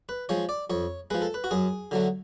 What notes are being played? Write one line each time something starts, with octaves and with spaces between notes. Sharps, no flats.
B4
F3 G#3 C#5
D5
F2 C#5
F3 G#3 B4
A4
B4
F#4
F#2 G#4
D3 F#3 A3